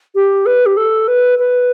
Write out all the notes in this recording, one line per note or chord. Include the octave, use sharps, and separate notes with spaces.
G4
B4
G4
A4
B4
B4